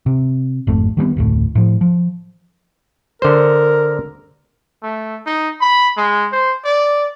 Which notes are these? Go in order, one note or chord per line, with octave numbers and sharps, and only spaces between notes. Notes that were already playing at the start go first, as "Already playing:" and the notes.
C3
G#1 F2 A3
D#3 G3 A3 B3
F1 D2 A2
A2 F3
F3
D3 A#4 C5
A3
D#4
B5
G#3
C5
D5